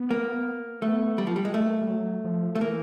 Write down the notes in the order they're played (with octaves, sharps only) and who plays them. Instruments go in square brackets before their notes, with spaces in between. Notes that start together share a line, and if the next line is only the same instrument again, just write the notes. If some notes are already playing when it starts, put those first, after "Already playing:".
Already playing: [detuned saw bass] B3
[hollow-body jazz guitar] A#3
[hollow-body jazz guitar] A3 [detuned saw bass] B3
[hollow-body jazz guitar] G3
F3
G3
G#3
A3
[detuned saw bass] A#3
G3
F#3
F3
[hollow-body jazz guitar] A3
[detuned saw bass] E3 [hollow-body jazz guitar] A#3